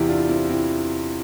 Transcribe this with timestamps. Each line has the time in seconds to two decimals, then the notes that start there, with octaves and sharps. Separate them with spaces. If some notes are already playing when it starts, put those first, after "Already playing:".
Already playing: E2 C3 E3 E4 G4
0.09 D4 F4
0.29 C4 E4
0.49 C4 E4